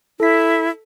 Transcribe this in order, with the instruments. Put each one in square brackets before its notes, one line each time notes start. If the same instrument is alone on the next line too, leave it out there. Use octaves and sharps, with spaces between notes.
[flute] E4 [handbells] A4 B6